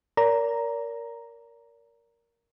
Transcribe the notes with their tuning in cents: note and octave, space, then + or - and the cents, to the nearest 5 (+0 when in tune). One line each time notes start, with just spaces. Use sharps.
A#4 +0 D5 -40 A#5 +0